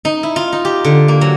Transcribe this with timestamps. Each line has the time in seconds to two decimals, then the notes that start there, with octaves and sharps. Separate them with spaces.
0.05 D#4
0.23 E4
0.36 F4
0.52 D#4
0.65 G4
0.84 D3
1.08 A#3
1.21 F#3